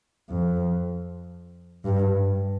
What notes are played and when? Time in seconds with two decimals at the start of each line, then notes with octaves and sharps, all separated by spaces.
0.29 F2
1.85 G2